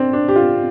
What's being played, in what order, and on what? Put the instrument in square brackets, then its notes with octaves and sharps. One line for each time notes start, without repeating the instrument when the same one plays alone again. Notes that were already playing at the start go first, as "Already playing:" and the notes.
Already playing: [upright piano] C4 D4
D4
G4
F4